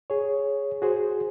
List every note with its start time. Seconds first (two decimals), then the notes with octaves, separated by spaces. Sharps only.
0.10 G#4 C#5
0.82 F#4 G#4 C5